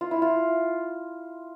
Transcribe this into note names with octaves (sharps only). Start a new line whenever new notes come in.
F4
E4
F4